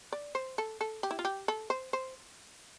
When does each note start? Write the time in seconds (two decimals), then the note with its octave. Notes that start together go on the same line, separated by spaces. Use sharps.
0.12 D5
0.35 C5
0.58 A4
0.81 A4
1.03 G4
1.11 E4
1.19 F4
1.25 G4
1.48 A4
1.70 C5
1.93 C5